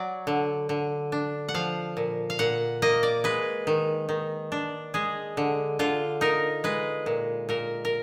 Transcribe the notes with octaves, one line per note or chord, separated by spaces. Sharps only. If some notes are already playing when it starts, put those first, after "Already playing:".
Already playing: F#3 D5
D3
D3
D4
F#5
F3 F5
A#2
F5
A#2 F#5
A#3 D#5
D5
G#3 B4
D#3
D#3
D4
G#3 G#4
D3
D3 F4
D#4 A#4
G#3 B4
A#2
A#2 A#4
A#4